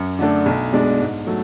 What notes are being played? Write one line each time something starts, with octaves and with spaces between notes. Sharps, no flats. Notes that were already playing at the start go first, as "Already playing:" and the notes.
Already playing: F#2
D3 A3 D4
B1
B2 G#3 D4
G#2
F#3 A3